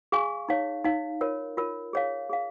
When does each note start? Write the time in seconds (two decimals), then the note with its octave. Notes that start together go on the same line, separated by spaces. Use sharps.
0.12 G#4 F5 G#5 C#6
0.49 D#4 C#5 F5
0.84 D#4 C#5 F5
1.21 F4 A#4 C#5
1.57 F4 A#4 C#5
1.93 G#4 C#5 F5
2.30 G#4 C#5 F5